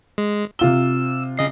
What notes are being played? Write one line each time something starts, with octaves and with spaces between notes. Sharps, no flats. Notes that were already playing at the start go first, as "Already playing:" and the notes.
G#3
C3 F4 E6 G7
C#3 D#5 C7